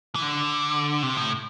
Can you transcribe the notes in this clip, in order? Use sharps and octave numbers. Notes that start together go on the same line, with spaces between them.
E3
D3
C3
A2